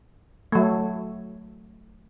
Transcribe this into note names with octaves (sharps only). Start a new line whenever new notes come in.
F#3 A3